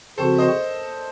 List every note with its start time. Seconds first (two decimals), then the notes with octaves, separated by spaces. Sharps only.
0.18 C#3 F3 C4 F#4 A4 C5
0.38 C5 D#5